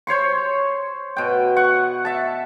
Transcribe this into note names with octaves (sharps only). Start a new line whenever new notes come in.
C5 C#5 C6 C#6
B2 G5
F#5 C#6
E5 A5